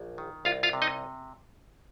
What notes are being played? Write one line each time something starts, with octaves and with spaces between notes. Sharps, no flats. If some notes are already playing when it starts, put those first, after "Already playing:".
Already playing: A#1
D#3
C2 F4 F5
F4 F5
C3
D#4 D#5